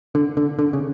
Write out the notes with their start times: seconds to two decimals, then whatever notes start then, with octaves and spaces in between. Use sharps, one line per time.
0.15 D3
0.37 D3
0.59 D3
0.73 C#3